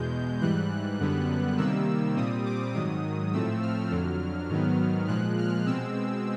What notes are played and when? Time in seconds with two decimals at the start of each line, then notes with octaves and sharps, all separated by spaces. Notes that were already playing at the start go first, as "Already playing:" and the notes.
Already playing: E2 B2 G#3 G6
0.41 G#2 E3 G3 F#6
1.00 F#2 D3 G3 B3
1.58 C3 D#3 G3 A#3 E6
2.16 A#2 G3 C4 D#6
2.45 D6
2.74 G#2 D#3 F#3 D#6
3.33 A2 F3 A3 C4 E6
3.62 F6
3.91 F2 D3 F#3
4.49 G#2 D#3 F#3 B3
5.08 A#2 F3 G#3 F#6
5.38 F6
5.66 B2 G#3 C4 E6